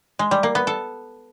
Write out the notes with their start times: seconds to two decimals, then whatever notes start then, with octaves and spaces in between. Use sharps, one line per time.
0.19 G#3
0.31 G3
0.43 A#3
0.55 B3
0.67 A4